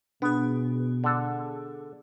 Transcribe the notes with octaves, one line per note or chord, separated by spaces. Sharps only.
B2 B3 D4 G#4
D3 A4